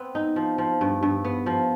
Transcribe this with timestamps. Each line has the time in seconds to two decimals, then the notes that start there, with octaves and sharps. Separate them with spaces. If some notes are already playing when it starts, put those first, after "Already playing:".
Already playing: B3 C4
0.15 D#4
0.36 F3
0.58 F3
0.81 G2
1.03 G2
1.25 B3
1.46 F3